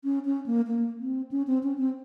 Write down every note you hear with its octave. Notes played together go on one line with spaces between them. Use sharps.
C#4
C#4
A#3
A#3
C4
C#4
C4
C#4
C4